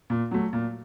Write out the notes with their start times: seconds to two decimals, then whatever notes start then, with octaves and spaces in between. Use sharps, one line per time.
0.10 A#2
0.31 F#3 A3
0.53 A#2